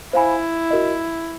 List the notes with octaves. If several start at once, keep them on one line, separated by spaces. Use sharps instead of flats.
E4 C5 F5 G#5 B5
F#4 A#4 D#5